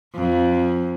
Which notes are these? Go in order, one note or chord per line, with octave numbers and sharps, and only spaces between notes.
F2